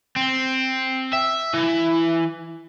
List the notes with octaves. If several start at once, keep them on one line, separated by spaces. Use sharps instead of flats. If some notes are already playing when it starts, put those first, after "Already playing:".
C4
E5
E3